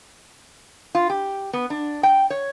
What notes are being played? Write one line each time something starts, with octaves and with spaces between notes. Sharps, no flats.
F4
G4
B3
D4
G5
C#5